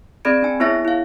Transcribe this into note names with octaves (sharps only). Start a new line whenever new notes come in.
C4 G#4 D5 B5 G#6 D7
D4 G#5
B3 E4 G#4 C#5 E5 A#6
E4 F5